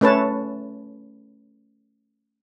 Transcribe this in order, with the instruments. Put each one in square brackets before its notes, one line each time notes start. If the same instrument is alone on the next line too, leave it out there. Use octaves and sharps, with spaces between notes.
[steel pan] A3 C#4 B4 C#5 A5